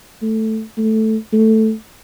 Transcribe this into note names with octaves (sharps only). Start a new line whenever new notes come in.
A3
A3
A3